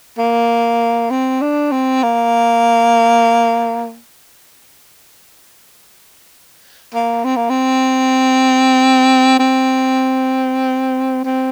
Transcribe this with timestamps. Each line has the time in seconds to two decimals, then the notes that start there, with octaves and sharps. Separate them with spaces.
0.18 A#3
1.11 C4
1.42 D4
1.71 C4
2.03 A#3
6.94 A#3
7.24 C4
7.37 A#3
7.50 C4
9.39 C4
11.25 C4